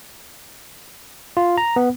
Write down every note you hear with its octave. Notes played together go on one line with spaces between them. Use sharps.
F4
A#5
B3